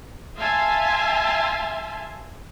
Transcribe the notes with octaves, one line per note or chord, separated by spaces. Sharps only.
E5 F5 G#5 A5 C6